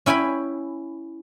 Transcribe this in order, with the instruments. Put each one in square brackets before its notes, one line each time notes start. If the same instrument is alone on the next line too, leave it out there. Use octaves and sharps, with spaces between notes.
[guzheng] C#4 E4 G5 G#5 B5